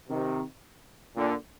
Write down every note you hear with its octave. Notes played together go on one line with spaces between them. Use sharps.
C3 D#3
A#2 D3